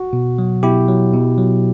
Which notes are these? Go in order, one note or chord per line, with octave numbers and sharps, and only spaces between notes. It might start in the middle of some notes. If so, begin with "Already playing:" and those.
Already playing: F#4
B2
F#3
B2 E4 G4
F#3
B2
F#3